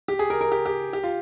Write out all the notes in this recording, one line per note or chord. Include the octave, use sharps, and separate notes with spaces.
G4
G#4
A#4
A#4
G4
G4
G4
F4